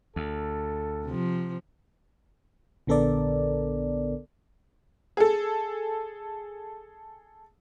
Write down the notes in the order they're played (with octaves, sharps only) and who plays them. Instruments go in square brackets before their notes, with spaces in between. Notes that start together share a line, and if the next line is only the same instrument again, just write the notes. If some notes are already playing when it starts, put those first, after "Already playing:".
[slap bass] D2 [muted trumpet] A4
[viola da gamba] C3 F3
[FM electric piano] A#1 D3 B3 A4 A#4 D5
[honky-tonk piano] G#4 A4